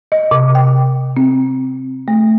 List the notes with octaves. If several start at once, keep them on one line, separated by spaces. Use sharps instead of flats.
D#5
C3
G5
C4
A3